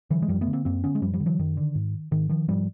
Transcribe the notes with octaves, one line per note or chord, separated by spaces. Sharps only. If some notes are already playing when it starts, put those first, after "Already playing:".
D3 E3 F#3
G#3
F#2 F3 G3
A3 B3
D3
A#3 C4
F#2 A#3 C4
D3 B3 C#4
G#3
F#2 F3 G3
F3 G3
D3
E3 F#3
F#2 D#3
D3
G#2
G#2 D#3
D#3 F3
G#2 F3 G3